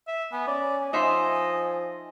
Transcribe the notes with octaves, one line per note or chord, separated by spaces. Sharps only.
E5
B3 G#5
C#4 D5
F3 D#4 D#5 E5 C6